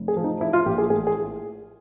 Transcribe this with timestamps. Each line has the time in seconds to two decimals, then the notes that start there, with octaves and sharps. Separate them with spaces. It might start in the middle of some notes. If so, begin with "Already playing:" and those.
Already playing: F1
0.08 G#4
0.16 F3
0.24 D#4
0.40 F3 E4
0.53 F4
0.66 A#1 G4
0.78 G#4
0.90 A1 G#4
1.07 G#4